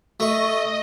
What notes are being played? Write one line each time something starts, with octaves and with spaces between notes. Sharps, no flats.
A3 D#5 C#6